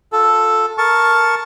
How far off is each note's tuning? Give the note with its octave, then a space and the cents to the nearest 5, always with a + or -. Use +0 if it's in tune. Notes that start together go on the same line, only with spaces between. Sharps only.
F4 +30 A4 +0
A#4 +0 A5 +0 C#6 +0